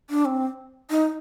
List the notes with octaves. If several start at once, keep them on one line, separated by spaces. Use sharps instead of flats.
D4
C4
D#4